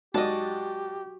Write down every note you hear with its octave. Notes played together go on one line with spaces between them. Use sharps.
G#2 F#4 G4 D5 D#5 A5